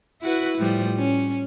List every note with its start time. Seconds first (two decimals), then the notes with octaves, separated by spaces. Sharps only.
0.21 E4 F#4 B4
0.58 A2 F3 G3
0.97 C#4